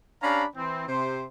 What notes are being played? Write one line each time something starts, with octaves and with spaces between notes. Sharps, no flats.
C#4 D4 G4 F5 A#5 B5
E3 C4
C3 C5